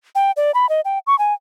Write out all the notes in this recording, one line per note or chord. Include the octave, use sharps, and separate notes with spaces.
G5
D5
B5
D#5
G5
C#6
G#5